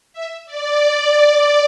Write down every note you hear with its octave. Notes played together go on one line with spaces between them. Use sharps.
E5
D5